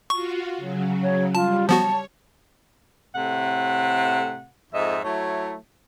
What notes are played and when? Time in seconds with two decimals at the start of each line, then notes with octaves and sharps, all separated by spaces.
0.10 F4 F#4 C#6
0.57 C#3 F#3
1.03 C#5
1.35 G3 F4 A5
1.69 F3 B3 F#4 C#5 A5
3.14 A2 C3 A3 F#5
4.73 F2 G#2 D#5 E5
5.03 F#3 A3 E4 C#5